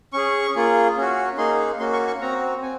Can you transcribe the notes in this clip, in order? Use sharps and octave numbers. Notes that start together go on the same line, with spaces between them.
C#4 G#4 C#6
A#3 F4 G#4
C#4 F#4
A#3 D#4 G#4 C6
A#3 C#4 F#4 C6
C#6
C#6
C4 F#4 A#5
C4 G#5